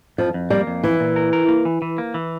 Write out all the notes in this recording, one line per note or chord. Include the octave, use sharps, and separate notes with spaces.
F2 F3
F2
G3 A#3
F2
E3 E4
A#2
A#4
A#4
A#3
E3
E3
A#3
E3